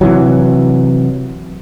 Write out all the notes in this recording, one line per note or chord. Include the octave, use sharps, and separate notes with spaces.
C3 E3 F#3